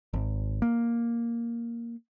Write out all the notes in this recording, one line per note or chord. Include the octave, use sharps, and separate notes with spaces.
G#1
A#3